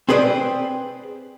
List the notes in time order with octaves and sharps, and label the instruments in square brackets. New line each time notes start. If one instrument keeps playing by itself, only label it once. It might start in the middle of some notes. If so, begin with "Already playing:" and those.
[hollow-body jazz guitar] C4 G#4 B4 C5 D5